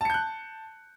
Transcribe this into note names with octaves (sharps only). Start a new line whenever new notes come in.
A5 F#6 G6 C#7